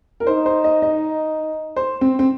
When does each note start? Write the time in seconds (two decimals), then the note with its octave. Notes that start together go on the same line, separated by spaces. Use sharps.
0.20 A#4
0.26 D#4 C5
0.46 C5
0.64 D#5
0.82 D#5
1.76 C5
2.01 C4
2.19 C4